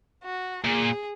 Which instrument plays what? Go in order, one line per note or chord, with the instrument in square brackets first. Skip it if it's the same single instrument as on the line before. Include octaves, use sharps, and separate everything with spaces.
[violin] F#4
[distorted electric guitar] A#2 [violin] G#4